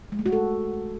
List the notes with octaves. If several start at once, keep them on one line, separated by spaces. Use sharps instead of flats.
G#3
A3
F#4
A4